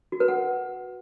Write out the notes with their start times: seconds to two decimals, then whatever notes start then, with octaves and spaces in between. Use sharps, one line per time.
0.12 F#4
0.20 B4
0.28 F#5